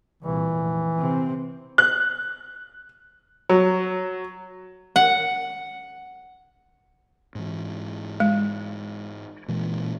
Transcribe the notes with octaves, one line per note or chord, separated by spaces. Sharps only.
C2 A#2 E3
F1
C3 C4
F#6
F#3
F#5
G#2 E3
G#3
A#2 E3 G#3